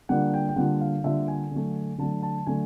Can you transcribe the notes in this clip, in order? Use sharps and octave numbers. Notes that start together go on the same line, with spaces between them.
D3 G3 A#3 D4 F4 F#5
G5
G5
D3 G3 A#3 D4 F4 F#5
F5
D3 G3 A#3 D4 F4 E5
G#5
D3 F#3 A3
D3 F#3 A3 A5
A5
D3 F#3 A3 G#5